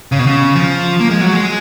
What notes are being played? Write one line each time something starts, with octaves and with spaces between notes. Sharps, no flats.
C#3
B2
C#3
F3
A#3
G#3
F#3
G#3